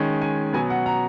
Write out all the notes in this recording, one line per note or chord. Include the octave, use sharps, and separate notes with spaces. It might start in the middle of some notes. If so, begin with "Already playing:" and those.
Already playing: D#3 G#3 C#4
G#5
B2 F#3 B3 G#5
F#5
A#5